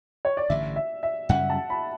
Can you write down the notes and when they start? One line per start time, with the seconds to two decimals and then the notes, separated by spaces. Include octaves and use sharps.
0.25 C#5
0.37 D5
0.50 A1 G2 D3 E5
0.76 E5
1.03 E5
1.29 F#2 C#3 G3 C#4 F#5
1.50 A5
1.70 B5